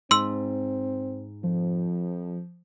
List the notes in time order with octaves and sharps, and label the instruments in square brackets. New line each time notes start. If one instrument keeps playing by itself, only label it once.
[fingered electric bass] G#2 [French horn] C4 [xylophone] C6 E6
[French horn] F2 [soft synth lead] F3